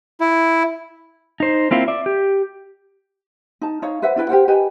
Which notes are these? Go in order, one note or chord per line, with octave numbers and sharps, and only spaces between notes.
E4
D#4 C5
A#3 C4 E4 F4
D5 E5
G4
D#4 A5
D#4 C#5 F5
B4 C5 E5 F#5
D4 E4 B4 G5
G4 A#4 C5 F#5
G4 B4 D#5 G#5